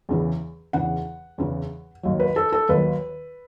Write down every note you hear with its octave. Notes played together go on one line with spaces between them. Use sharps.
E2 C#3 E3
E2 C#3 E3 F#5
E2 C#3 E3
D#2 D#3 F#3
B4
A4
A4
D#2 D#3 F#3 B4